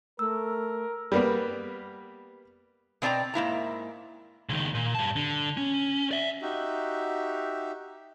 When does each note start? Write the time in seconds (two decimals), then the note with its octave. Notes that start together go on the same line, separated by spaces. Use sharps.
0.19 A3 A#4 E6
1.12 G3 A#3 B3
3.02 B2 C4 D5 G5 A#5
3.34 G#2 A#3 E4 A#5
4.49 C#2 D#3
4.74 A#2
4.95 G2 A5
5.16 D3
5.57 C#4
6.11 D5 E5
6.42 D#4 F#4 G4 E5